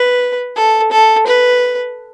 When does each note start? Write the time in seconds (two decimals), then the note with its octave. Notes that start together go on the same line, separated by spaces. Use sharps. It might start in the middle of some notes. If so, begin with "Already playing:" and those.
Already playing: B4
0.56 A4
0.92 A4
1.27 B4